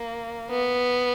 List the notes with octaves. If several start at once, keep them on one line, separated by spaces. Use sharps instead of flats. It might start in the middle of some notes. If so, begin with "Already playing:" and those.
Already playing: A#3
B3